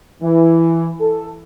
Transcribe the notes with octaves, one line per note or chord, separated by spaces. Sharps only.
E3
A4